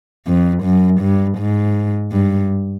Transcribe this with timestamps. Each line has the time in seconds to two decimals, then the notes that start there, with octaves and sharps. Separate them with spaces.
0.27 F2
0.63 F#2
1.01 G2
1.38 G#2
2.12 G2